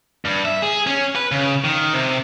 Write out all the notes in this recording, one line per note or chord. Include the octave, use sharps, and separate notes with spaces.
G2
E5
G#4
C#4
B4
C#3
D#3
C3